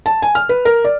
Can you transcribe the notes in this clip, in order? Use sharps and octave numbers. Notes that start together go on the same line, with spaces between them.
A5
G#5
F6
B4
A#4
D5